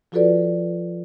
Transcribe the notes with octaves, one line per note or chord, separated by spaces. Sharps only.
F3 F4 F#4 A4 B4 D5